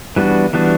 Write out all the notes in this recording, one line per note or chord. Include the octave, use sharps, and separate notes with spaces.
E3 G3 B3 D4 F#4
E3 G3 B3 D4 F#4